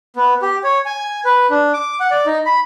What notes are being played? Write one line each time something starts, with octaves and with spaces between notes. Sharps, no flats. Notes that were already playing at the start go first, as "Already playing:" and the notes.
B3
G4
C#5
G#5
B4
D4
D6
F#5
D5
D#4
B5